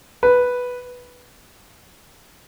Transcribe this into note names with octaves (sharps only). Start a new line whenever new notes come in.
B4